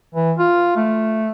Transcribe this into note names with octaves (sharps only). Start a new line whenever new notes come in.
E3
F4
A3